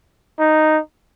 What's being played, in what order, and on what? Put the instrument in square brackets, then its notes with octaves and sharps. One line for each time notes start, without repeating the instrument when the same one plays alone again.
[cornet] D#4